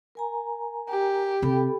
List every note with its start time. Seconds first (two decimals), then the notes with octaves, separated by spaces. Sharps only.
0.15 A#4 G#5 A#5
0.90 G4
1.42 C3 A4 G5 B5